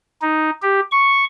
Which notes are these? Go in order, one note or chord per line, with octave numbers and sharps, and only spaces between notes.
D#4
G4
C#6